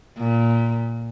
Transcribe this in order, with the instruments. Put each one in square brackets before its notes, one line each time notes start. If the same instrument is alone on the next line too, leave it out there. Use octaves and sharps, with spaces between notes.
[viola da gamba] A#2